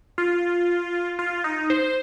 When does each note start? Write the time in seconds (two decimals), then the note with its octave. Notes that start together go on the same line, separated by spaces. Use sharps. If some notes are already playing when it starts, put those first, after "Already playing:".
0.18 F4
1.19 F4
1.44 D#4
1.70 C5